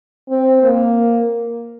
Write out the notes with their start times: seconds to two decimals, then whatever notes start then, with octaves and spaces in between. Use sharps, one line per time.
0.29 C4
0.63 A#3